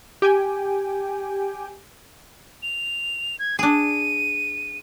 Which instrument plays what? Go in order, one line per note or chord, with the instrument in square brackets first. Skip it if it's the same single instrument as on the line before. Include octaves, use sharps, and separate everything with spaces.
[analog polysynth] G4 G5 G#5
[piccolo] F7
G#6
[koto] D4 G#4 [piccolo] D#7